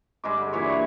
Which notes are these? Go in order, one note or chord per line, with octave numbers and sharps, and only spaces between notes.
G2 G#3 D6
D3
A#2 E3 C#5
C#6